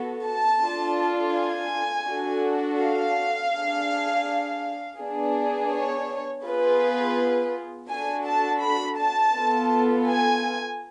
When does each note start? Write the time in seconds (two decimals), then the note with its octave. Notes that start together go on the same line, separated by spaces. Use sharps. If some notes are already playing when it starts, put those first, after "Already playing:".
Already playing: B3 F#4 A4
0.25 A5
0.62 D4 F4 A4
1.35 G#5
2.08 D4 F#4 A4
2.81 F5
3.53 D4 G#4
4.99 B3 D4 G#4
5.71 C#5
6.44 B3 F4 G#4 B4
7.90 D4 F#4 A4 G#5
8.26 A5
8.63 B5
8.99 A5
9.35 B3 F4 A4
10.08 G#5